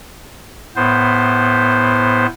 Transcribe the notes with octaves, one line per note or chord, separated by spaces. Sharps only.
A2 B3 C5